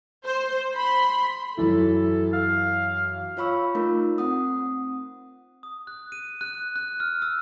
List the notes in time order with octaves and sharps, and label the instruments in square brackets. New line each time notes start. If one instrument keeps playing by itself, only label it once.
[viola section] C5
B5 C6
[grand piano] F#2 E3 E4 [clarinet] A4
[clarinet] F5
[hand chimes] F4 C#5 F5 B5 C#6 E6
A3 D#4 F4 A#4
C4 F#5 D#6
[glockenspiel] D#6
F#6
D#7
F#6
F#6
F6
E6